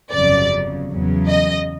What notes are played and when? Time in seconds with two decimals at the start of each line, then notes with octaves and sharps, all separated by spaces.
0.12 G1 F2 C#3 F#3 D5
0.90 E2 C#3 F#3
1.30 D#5